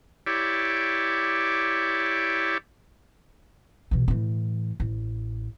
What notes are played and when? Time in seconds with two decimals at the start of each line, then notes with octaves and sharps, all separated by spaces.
0.27 E4 G4 C#5 D5
3.91 B2 E3
4.08 A2 E3
4.80 A1